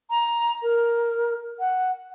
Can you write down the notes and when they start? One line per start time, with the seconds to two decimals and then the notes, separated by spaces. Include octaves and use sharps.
0.10 A#5
0.63 A#4
1.59 F#5